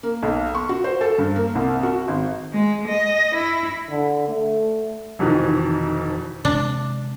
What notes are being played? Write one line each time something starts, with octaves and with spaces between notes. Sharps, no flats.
A#3
B1
C#6
F#4
C5
A4
G2
A#3
C2
F#4
G#1
G#3
D#5
E4
D3
A3
F1 F2 B2 D#3 E3
C3 G#3 D4